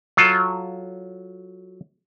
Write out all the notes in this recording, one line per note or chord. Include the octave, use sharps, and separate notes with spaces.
F#3 F4 A4